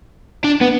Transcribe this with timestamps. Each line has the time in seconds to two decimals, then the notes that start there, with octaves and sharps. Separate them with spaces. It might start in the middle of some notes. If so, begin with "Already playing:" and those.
0.44 D4
0.61 B3